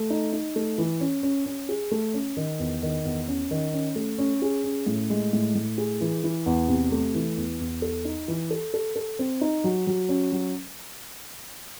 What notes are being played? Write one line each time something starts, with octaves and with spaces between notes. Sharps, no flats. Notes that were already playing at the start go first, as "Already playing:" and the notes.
Already playing: A3
D#4
D#4
A3
E3
C#4
C#4
C#4
G#4
A3
C#4
D#3
E2
D#3
E2
C#4
D#3
C#4
A3
C#4
G#4
C#4
A2
G#3
A2
A2
G#4
E3
E3
E2
C3
A3
E3
E2
E2
A4
D#4
E3
A4
A4
A4
C4
D#4
F#3
F#3
C#4
F#3